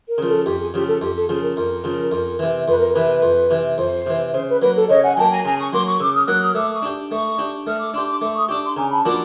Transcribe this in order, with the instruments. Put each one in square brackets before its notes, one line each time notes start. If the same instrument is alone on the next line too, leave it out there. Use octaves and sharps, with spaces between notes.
[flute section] A#4
[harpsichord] C#3 F3
[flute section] A4
[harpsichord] F2 [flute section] G4
[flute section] G#4
[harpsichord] C#3 F3 [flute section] G4
[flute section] A4
[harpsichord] F2 [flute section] G4
[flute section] A4
[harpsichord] C#3 F3 [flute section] G#4
[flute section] A#4
[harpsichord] F2
C#3 F3
F2
C3 E3
[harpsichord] F2 [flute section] B4
[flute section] A#4
[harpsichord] C3 E3 [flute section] B4
[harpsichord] F2
C3 E3
[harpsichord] F2 [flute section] C5
[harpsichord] C3 E3
[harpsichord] C#3 [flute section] C5
[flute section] B4
[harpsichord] F#3 A#3 [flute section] B4
[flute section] A4
[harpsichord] C#3 [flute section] C#5 D#5
[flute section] F#5 G#5
[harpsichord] F#3 A#3 [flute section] G5 A5
[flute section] G#5 A#5
[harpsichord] C#3 [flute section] G#5 A#5
[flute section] C#6 D#6
[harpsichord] F#3 A#3 [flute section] C6 D6
[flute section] C#6 D#6
[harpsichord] C#3 [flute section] D6 E6
[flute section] D#6 F6
[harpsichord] F#3 A#3 [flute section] E6 F#6
[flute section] D#6 F6
[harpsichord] A3 [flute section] D6 E6
[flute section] C#6 D#6
[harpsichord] D4 G4
[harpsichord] A3 [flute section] C#6 D#6
[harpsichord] D4 G4
[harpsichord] A3 [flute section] D#6 F6
[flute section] D6 E6
[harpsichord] D4 G4 [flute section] C6 D6
[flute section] C6 D6
[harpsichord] A3 [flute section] D6 E6
[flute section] C#6 D#6
[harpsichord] D4 G4 [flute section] D6 E6
[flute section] C6 D6
[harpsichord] C#3 [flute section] G#5 A#5
[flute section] A5 B5
[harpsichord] F3 A#3 D4 F#4 [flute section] D6 E6